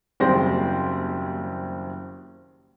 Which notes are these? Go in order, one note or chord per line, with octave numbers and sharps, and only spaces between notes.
F#1 D#2 G3 C4 C6 A#6